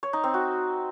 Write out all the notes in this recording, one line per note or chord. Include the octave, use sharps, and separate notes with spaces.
C#5
D#4
C4
F#4